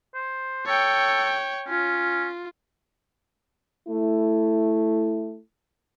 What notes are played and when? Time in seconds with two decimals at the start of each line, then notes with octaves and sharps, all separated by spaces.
0.14 C5
0.66 A4 C#5 G5
1.68 C#4 F4
3.88 A3 E4